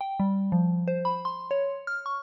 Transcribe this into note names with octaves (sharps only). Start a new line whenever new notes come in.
G5
G3
F3
C5
B5
C6
C#5
F6
C#6